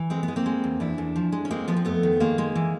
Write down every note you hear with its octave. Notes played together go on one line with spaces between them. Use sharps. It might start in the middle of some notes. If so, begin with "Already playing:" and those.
Already playing: E3
G#3 C4
B3
G#3
A#3 C4
G#3
E2
E2 D4 E4
E2
F3
G#3
C#4
G#3 A#3 C4
F3 B3
C4
F2 A3 B3
D#3
D#3 G#3 A#3
G#3
E3